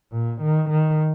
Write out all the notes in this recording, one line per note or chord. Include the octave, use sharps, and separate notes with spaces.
A#2
D#3
D#3